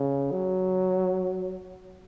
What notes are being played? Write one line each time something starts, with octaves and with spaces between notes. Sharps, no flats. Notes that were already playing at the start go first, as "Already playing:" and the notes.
Already playing: C#3
F#3